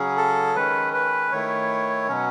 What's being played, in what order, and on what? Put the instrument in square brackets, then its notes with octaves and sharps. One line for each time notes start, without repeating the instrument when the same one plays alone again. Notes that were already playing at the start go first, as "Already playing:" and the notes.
Already playing: [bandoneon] C#3 F#3 C#4 G#4
[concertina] A4
[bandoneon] D#3 G#3 C#4 [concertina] B4
[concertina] B4
[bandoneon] D#3 A3 E4 [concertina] C#5
[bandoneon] B2 F#3 C#4